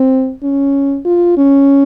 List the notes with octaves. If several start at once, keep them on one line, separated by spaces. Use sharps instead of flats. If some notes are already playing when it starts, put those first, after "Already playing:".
Already playing: C4
C#4
F4
C#4